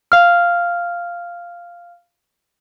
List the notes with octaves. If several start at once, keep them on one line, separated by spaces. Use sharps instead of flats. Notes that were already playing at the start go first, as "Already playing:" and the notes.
F5 F6